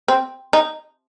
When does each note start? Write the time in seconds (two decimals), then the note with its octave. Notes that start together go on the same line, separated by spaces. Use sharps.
0.08 C4
0.53 D#4